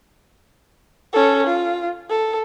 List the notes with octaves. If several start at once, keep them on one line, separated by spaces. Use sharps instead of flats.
C#4 A4
F4
A4